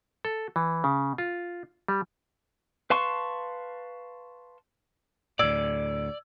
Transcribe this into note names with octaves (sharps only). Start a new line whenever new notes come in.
A4
E3
C#3
F4
G3
B4 F5 A5 C6 C#6
D2 A2 D5 E6 G#6